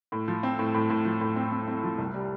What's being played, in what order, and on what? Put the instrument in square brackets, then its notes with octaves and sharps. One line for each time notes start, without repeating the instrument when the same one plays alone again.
[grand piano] A2
F3
C4
A2
A2
A2
F3
A2
C4
C4
C4
F3
C2
G3